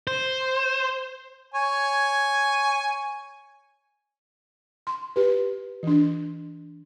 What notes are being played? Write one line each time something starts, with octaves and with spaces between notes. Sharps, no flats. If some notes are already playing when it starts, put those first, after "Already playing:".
C5
C#5 G#5
C6
G4 B4
E3 D4